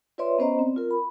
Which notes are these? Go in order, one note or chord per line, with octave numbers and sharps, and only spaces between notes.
F4 B4 C#5 D5 E5 C6
B3 C#4 C5 D5 D#5 A#5
C4
F4 A#4
B5